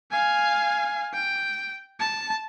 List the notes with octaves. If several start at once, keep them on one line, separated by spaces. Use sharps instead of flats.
F5 G#5
G5
A5